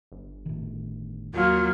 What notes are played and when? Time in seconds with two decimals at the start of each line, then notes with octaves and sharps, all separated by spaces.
0.12 G1
0.46 A2 D#3
1.34 D#2 F#3 A#3 F4